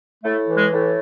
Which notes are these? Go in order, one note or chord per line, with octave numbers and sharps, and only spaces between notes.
A2 A3
E3
G#3
A2